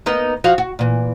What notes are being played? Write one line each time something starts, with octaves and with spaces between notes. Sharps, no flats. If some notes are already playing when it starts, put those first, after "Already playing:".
A#3 B3 D#4
F3 F#4 F5
F#4
A#2 E3